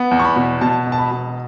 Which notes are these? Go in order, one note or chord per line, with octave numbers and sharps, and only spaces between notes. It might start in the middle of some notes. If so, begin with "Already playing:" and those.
Already playing: B3
E2
C#6
B5
B2
B2 A5
E1
A5
B5
B2